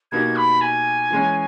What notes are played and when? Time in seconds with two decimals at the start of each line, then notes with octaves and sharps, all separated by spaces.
0.12 B2 A#3 D#4 G4 G#6
0.36 B5
0.61 G#5
1.11 E3 G#3 C#4